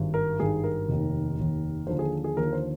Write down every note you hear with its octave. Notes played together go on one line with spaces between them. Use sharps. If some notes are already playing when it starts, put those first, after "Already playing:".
Already playing: G#1 G2 D#3
A#4
G#1 G2 D#3 G#4
A#4
F1 D#2 D#3
F1 D#2 D#3
D#2 D3 F3 C5
G#4
G#4
D#2 D3 F3 A#4
C5